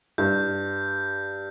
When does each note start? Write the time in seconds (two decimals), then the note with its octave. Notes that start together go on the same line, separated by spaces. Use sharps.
0.18 G2 G6